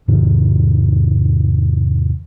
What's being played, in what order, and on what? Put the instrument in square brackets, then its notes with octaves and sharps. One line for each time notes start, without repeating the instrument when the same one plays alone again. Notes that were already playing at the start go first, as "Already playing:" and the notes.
[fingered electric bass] E2 G#2 C3 D#3